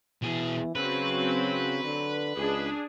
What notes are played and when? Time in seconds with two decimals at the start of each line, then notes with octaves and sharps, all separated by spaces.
0.23 B2 E3 G#4
0.76 C#3 F#3 C4 B4
1.84 D3
2.37 C#2 D4 G#4